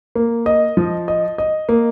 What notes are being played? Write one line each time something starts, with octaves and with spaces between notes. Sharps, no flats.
A#3
D#5
F3
D#5
D#5
A#3